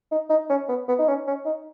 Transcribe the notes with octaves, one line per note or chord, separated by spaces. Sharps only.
D#4
D#4
C#4
B3
B3
D#4
C#4
C#4
D#4